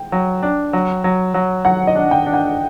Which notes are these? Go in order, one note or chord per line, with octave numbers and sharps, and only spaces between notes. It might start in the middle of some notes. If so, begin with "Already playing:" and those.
Already playing: G5
F#3
D4
F#3
F#3
F#3
F#3 F#5
D#5
D4
G5
D4
F#5